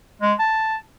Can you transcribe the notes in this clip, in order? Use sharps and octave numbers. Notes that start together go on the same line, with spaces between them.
G#3
A5